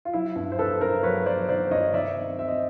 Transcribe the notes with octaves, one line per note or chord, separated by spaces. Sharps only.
F4
F#3 E4
G2
C5
G2 A4 B4
G2 A#4 C5
F#3 B4 C#5
F#3 C5 D5
D#3 C5 D5
G2 C#5 D#5
D#3 D5 E5
C4
C4 E5
D#5